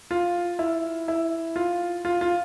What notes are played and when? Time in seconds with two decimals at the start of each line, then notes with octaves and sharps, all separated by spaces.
0.11 F4
0.59 E4
1.08 E4
1.56 F4
2.05 F4
2.21 F4